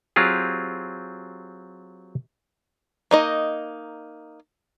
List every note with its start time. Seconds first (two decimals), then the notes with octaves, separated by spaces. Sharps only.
0.16 F#3 C4 F4 G4 G#4
3.11 A#3 D#4 D#5